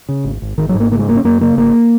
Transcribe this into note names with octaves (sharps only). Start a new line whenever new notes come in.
C#3
G#1
G#1
G#1 D#3
F#3
G#2
A#3
C#3 A#3
G#3
F#1 A#3
C#4
F#2 A#3
C#3 A#3
G#1 A#3